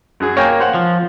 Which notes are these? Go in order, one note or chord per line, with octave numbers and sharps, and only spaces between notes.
F#2 F#4 G#4
A#3 C#5 G5 G#5
C5 F5 F#5
F3